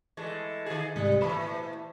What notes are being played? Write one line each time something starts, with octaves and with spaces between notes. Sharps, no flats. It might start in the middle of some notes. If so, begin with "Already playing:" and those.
E3 G#3 A3
D#3 G#4
C2 G#2 G3
A#2 E3 A3 C5 B5